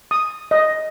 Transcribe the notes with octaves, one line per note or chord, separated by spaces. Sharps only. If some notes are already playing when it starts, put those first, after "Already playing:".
D#6
D#5